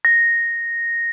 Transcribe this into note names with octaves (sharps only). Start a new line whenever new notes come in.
A#6